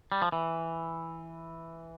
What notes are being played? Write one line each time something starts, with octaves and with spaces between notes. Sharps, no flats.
G3
F3
E3